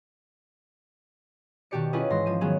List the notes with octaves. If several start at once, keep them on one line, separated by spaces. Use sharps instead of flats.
B2 D#3 F#4 G4 D5 C#7
C#4 E4 F4 G#4 B4 D#5
G#2 E3 C6 A#6
F3 D#7
D#3 F#3 B3 G#4